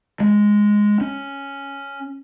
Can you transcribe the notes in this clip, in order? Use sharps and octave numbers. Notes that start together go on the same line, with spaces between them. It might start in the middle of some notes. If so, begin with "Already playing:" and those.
G#3
C#4